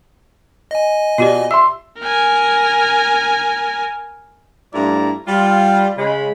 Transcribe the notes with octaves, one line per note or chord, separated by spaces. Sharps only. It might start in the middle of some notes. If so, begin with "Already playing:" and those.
D#5 G#5
B2 F4 G4 D5
E5 C6 E6
A#4 G#5
G2 F3 A3 E4 D5 A#5
G3 F4
C#3 G#3 B5